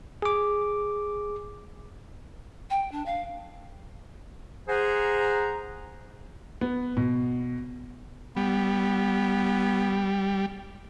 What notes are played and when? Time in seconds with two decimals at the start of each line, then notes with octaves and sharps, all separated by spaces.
0.22 G#4 D6
2.70 G5
2.92 D4
3.06 F5
4.69 G#4 C5 F#5 A#5
6.61 B3
6.97 B2
8.37 G3 B3